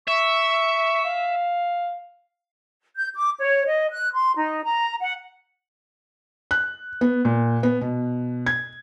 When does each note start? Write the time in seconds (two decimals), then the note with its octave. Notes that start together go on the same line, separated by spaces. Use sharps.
0.08 E5 C#6
1.05 F5
2.95 G6
3.15 D6
3.39 C#5
3.65 D#5
3.91 F#6
4.14 C6
4.36 D#4
4.64 A#5
5.00 F#5
6.51 F#6
7.01 B3
7.25 A#2
7.63 B3
7.81 B2
8.46 G#6